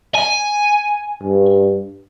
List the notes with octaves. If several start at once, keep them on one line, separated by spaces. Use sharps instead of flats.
G#5
G2